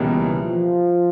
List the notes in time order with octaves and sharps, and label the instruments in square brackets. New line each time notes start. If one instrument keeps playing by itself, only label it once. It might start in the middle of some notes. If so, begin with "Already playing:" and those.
Already playing: [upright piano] C#2 B2 G3 A#3 [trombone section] E3
[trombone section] F3